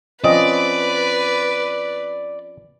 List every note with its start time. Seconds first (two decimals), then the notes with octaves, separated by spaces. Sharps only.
0.24 F3 C4 C#4 B4 D5 D#5